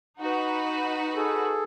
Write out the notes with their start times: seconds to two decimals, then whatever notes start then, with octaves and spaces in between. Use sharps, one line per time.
0.20 D#4 F#4 B4
1.15 G#4 A4